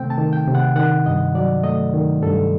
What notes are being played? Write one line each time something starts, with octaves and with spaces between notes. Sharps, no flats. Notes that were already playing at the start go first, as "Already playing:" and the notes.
Already playing: C3 D#3 A3 C4 G5
A5
D#3
G5
C3
F#5
D#3 F#5
G2 D#5
F#3 D5
A3 D#5
D#3
G2 A4